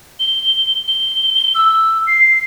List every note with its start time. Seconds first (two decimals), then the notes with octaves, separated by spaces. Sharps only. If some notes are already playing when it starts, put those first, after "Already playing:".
0.20 G7
0.87 G7
1.55 E6
2.07 C7